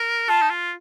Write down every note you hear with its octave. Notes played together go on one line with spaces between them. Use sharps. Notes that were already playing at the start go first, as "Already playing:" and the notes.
Already playing: A#4
F4 A5
D#4
F4